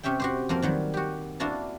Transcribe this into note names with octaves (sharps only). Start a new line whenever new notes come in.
C3 C#4 G4 E5 G5
F#4 G4 C5
F2 A#3 C4 A#4
D#3 F#3 G3
F#4 G4
A#3 D4 E4 F#4 A5